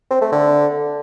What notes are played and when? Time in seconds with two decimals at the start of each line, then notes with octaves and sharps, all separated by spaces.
0.11 C4
0.22 A3
0.33 D3